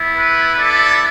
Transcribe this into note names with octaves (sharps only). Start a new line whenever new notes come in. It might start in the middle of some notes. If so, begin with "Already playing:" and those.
Already playing: B3 E4
B4
A4 D5